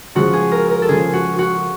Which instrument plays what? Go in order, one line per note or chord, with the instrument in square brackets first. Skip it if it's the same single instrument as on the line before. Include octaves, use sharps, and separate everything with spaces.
[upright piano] C#3 F3 G#3 [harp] F#4
[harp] G#4
A#4
A#4
A4
[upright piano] C#3 F3 G#3 [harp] G#4
[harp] F#4
F#4